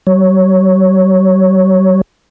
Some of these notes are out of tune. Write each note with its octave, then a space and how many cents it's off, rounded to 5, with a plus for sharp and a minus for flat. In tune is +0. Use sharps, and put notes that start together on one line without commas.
G3 -45 C#5 +0